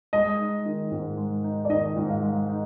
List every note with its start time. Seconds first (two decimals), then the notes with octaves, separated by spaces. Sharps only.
0.13 G#3 D#5
0.39 D#4
0.66 D#3
0.92 G#2
1.17 G#3
1.44 D#4
1.65 D5
1.70 D#3 D#5
1.96 G#2
2.10 F5
2.23 G#3
2.49 D#4